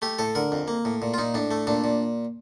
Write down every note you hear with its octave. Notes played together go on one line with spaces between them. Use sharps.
A3 G4
A2 A4
D3 A#4
F2
A#3
A2
A#2
F4
A#2 D#4
A2 D4
A3
A#2 D4
A#2